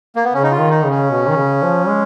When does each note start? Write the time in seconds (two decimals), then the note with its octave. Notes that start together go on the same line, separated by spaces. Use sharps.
0.16 A#3
0.24 B3
0.32 C#3 C#4
0.43 D#4
0.52 F4
0.58 D#3
0.70 D#4
0.84 C#3
0.90 C#4
1.10 B2
1.28 D#3
1.36 C#3
1.62 F3
1.88 G#3